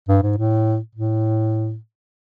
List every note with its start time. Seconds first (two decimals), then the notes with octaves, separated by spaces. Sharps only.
0.09 G2
0.22 G#2
0.37 A2
0.95 A2